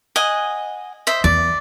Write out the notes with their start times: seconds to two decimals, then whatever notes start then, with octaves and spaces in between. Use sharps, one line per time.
0.16 D#5 F#5 G#5
1.07 C5 D#5 E5
1.24 E2 D5